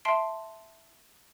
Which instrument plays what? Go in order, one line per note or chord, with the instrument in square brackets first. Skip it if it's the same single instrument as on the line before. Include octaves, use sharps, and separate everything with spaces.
[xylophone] E5 A5 C6 C7 D7